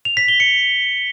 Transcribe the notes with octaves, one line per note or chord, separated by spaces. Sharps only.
F7
B6
G7
C#7